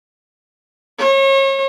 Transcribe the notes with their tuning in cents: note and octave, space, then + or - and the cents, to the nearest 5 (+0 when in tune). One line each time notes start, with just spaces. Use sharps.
C#5 -35